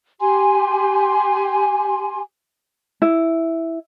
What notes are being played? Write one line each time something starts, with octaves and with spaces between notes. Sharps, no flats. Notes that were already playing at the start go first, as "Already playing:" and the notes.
G4 G#5 C6
E4